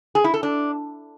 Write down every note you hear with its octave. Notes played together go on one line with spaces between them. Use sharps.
G#4
E4
A4
D4